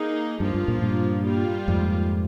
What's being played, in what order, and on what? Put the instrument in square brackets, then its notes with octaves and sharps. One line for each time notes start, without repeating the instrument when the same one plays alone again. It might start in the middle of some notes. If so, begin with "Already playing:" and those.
Already playing: [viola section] A#3 D#4 G#4
[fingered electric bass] G2 [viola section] F3 A#3 F4
[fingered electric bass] G2
G2 A#2
G2 A#2
[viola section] G3 A#3 F4
[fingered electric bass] F2 G#2